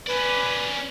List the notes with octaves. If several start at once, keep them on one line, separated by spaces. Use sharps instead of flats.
C#4 B4 D5